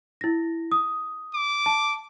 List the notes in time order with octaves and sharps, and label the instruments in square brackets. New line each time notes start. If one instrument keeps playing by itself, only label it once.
[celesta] E4 A#6
D#6
[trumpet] D6
[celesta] A5